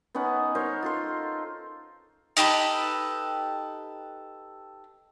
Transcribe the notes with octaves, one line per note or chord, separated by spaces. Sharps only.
B3 C#4 D#4 F#5
D#4 A#4 C5 C#5
F4 A4 C6
D#4 G4 A4 B4